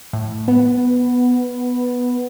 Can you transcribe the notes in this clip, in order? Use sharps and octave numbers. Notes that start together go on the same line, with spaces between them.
A2
B3